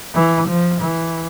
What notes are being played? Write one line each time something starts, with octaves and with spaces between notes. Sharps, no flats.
E3
F3
E3